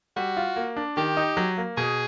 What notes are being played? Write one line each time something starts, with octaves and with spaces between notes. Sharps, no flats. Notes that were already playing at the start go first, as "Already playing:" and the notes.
G3 F#4
F4
A#3
D4
D#3 G4
D#4
F#3
A#3
B2 G#4